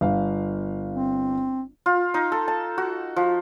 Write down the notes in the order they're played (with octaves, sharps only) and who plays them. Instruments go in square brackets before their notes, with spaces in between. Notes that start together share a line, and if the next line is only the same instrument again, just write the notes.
[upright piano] G1 F5
[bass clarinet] C4
[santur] F4
D#4
A4
A5
F#4
F3